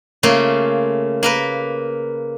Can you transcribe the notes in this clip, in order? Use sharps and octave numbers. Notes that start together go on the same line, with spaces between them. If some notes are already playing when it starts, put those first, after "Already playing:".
C#3 A3 A#3 F4
A#3 A#4 B4